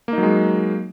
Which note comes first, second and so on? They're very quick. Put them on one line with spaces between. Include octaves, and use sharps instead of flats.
A#3 D#4 F#3 G#3